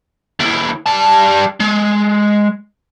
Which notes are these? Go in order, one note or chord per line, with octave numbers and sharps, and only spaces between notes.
D#2 E4
G3 A5
G#3